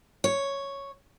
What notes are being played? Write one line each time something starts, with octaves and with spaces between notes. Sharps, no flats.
C#5